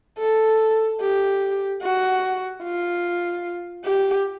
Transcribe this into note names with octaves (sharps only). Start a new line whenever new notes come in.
A4
G4
F#4
F4
G4